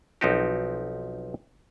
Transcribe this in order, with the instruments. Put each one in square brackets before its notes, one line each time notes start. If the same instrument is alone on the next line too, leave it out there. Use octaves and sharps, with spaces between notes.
[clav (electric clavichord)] B1 F3 C4 D#4 F#4 G4